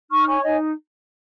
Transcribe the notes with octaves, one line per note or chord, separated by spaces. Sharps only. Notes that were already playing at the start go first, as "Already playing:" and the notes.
D#4 C#6 F6
C#5 G#5 C#6
D#4 D#5 G#5